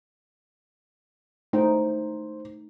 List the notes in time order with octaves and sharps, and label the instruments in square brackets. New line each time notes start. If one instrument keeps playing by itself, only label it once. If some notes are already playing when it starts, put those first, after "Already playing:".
[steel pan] A3 D#4 G5 [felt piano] C5